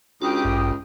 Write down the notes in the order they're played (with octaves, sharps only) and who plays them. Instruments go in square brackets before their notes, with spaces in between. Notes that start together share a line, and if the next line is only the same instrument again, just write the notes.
[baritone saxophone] C#2 [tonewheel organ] D4 F#4 [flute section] G4 G5 D#6
[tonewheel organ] A1 G2